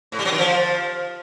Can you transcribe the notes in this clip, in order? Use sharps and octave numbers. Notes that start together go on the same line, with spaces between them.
A2
G3
F#3
D#3
F3